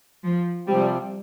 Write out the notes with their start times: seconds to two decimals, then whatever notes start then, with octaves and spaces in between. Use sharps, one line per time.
0.24 F3
0.67 C3 F3 G3 C4